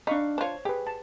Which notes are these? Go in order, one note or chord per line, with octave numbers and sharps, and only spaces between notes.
D4 D#4 F5 B5 C#6
D4 F4 C5 C#5
G4 G#4 B4
A5